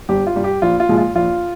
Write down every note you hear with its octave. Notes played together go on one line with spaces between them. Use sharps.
G1 G4
F4
G2 G3
G4
A#1 F4
F4
A#2 F3 G#3
F4
A#1 F4